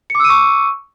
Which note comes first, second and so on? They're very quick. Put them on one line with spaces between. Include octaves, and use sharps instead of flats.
C#7 D6 E6 D#7 C#6